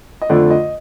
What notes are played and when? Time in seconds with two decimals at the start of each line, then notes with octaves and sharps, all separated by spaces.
0.22 D#5
0.29 F2 D3 F3 A3 D5
0.51 D#5